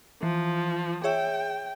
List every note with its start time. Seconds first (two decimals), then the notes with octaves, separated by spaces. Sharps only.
0.23 E3 F3
1.04 G#4 C#5 E5 G5